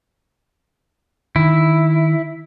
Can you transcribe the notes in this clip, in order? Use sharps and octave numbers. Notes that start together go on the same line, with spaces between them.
D#3 E4